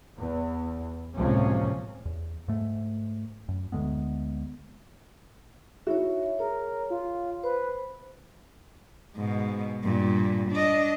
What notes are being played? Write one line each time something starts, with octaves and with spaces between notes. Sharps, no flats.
E2
F#1 C#2 A2 C3 F3 C#4
E2
G#2 A3
F#2
D2 D3 G#3 B3
D#4 E4 F#4 C#5 E5
G#4 A#4 C#5
F4
B4 C5
G#2 B2
G2 A#2
D4 D#5